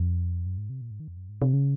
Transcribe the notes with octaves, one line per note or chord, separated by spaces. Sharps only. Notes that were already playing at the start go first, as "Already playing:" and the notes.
Already playing: F2
F#2
G#2
C3
A#2
G#2
D#3
F2
F#2
G#2
C3
C#3